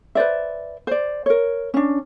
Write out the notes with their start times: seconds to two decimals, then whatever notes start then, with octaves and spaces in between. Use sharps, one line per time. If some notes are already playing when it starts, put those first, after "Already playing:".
0.15 B4 C5 D5 E5
0.87 C5 D5
1.26 A#4 C#5
1.74 C#4 D4